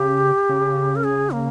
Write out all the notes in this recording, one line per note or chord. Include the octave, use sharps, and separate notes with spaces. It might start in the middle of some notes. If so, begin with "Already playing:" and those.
Already playing: C#3 G4
C#3
A#4
G#4
A#3